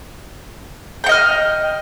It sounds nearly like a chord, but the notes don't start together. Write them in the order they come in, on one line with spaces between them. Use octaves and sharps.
G5 F#5 D#5 F6